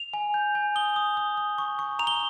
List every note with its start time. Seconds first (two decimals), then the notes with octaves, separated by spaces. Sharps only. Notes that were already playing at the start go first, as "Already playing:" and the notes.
Already playing: F7
0.14 G#5
0.34 G6
0.55 G#5
0.76 D#6 G7
0.96 D#6
1.17 D#6
1.37 D#6
1.58 C#6
1.79 C#6
1.99 A#5 F7
2.07 G7